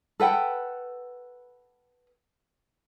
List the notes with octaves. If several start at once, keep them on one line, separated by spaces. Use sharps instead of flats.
A4 B4 F#5 G5